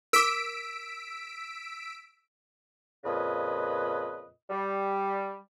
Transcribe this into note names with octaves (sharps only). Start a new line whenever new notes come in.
A#4 D6 E6 B6 D7
F2 A#2 C#3 B4 D#5
G3